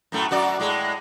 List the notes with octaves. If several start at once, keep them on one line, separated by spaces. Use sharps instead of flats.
F#2 A2 A3
F#2 F#4 D5
A2 G#3